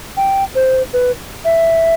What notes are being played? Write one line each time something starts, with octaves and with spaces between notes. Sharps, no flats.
G5
C5
B4
E5